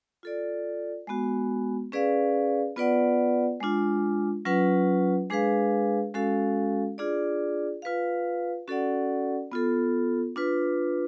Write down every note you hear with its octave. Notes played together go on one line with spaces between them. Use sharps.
F4 A4 D5
G#3 B3 F#4
C#4 G#4 B4 D5 F5
B3 F4 B4 D5 F#5
G#3 D4 F4
F#3 C#4 F4 B4 F#5
G#3 D4 G#4 B4 F5
G#3 C#4 F#4 A4 F5
D4 F4 G#4 D5
F4 B4 F5
C#4 F#4 A4 D5 F#5
B3 F4 A4
D4 F4 B4